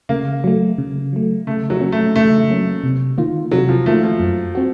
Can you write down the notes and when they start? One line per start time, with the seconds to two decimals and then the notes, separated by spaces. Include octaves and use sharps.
0.09 C#3 A#3
0.44 F#3 A3
0.78 C#3
1.13 F#3 A3
1.47 C#3 A3
1.70 F#3
1.80 F#3 A#3 C#4
1.92 A3
2.15 C#3 A3
2.50 F#3 A#3 C#4
2.84 C3
3.18 D#3 A#3 F4
3.51 C3 F#3
3.69 F3
3.86 D#3 A3 A#3 F4
4.03 F3
4.20 F#2
4.55 C4 F#4